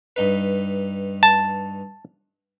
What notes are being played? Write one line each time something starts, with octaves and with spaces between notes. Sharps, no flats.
G2 D#4 B4
A5